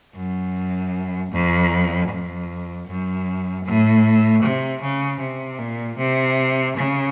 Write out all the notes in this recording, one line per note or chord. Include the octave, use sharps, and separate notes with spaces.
F#2
F2
F2
F#2
A2
C3
C#3
C3
A#2
C3
C#3